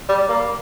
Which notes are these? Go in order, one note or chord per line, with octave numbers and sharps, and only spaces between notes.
G3
A#3